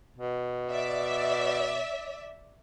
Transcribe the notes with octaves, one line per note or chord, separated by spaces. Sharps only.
B2
D5 E5